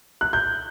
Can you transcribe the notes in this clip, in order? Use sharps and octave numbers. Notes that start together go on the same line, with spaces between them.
F#6
G6